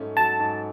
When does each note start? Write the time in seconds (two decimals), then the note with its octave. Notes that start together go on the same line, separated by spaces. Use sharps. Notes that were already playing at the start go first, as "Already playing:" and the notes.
Already playing: G#2 F#3 A3 C#4
0.17 F#3 A5
0.40 G#2